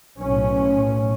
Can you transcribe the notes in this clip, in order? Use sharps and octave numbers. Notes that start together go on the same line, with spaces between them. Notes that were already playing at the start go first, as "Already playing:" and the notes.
B1 A2 C#4